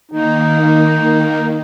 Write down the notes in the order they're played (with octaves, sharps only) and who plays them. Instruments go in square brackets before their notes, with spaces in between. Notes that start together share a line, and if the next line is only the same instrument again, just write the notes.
[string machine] D#3 A#3 [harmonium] D#4